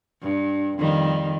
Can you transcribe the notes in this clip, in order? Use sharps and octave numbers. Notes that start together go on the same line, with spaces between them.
G2
F2 D#3 G3